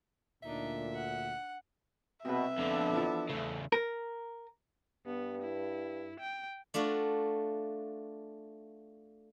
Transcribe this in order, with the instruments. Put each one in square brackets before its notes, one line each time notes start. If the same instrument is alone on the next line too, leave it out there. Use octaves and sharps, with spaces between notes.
[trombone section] D2 A#2 [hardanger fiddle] D4 D#4 [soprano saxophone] E5
[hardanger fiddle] F#5
[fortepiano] C2 B4 [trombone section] B2 [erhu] E5
[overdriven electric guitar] F2 D3 [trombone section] B3 D4 A4
[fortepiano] E3 F3
[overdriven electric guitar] E2 C#3 [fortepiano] A3
[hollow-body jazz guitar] A#4
[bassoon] G2 [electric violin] B3
[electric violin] E4
G5
[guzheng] A3 D4 F4 F#4